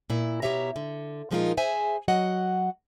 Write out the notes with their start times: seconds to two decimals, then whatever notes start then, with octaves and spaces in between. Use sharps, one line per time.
0.10 A#2 E4
0.42 B2 E3 G4 C#5 E5 A#5
0.76 D3
1.31 A#2 F3 G#3 D#4 F4 A#4
1.57 G#4 C5 E5 G#5
2.08 F#3 F#4 D#5 F#5